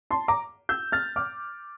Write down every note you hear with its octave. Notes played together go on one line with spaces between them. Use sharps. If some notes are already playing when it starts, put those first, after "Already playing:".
A5 C6
A#5 D6
E6 G6
F6 A6
D6 F6